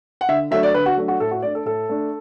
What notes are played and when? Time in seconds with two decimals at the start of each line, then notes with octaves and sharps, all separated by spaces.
0.21 F#5
0.28 D3 E5
0.51 F#3 A3 D4 E5
0.63 D5
0.74 D3 B4
0.86 F#4
0.97 F#3 A3 D4
1.08 F#4
1.20 A2 A4
1.31 F#4
1.42 A3 D4 D5
1.55 A4
1.65 A2 A4
1.89 A3 D4